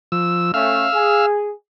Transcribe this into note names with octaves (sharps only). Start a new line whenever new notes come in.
F3 E6
A3 C#4 F5 E6 F6
G#4